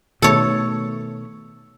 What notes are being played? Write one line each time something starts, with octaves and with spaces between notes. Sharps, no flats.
B2 D#3 A3 A4 C#5